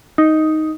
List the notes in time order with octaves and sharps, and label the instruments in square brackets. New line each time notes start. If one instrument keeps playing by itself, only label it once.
[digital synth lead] D#4